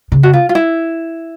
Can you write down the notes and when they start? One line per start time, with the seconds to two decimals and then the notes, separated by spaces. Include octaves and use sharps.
0.12 C#3
0.23 F#4
0.33 F4
0.49 F4
0.55 E4